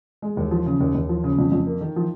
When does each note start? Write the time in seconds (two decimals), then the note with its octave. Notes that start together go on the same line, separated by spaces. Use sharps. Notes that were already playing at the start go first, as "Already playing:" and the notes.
0.22 G#3
0.37 D#2
0.51 F3
0.66 C#3
0.80 D#2
0.94 D#2
1.09 F3
1.24 C#3
1.38 F2
1.52 F2
1.67 A#3
1.81 D#3
1.96 F3